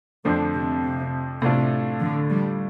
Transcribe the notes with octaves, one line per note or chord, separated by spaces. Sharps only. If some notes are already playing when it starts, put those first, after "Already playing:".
F2 D3 F3 A3 D4
C3
C3
A2 C3 A3 D4 F4 A4
D3
G3